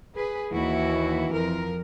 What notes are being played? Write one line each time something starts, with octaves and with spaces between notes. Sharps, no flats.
G#4 B4
D#2 E3 E4 F#4
F2 F3 A#4